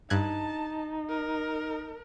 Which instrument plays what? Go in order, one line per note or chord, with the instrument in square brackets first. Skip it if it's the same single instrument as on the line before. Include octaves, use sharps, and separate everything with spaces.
[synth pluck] G2 F#6 G#6 [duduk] D#4 [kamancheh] A5
[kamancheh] A#4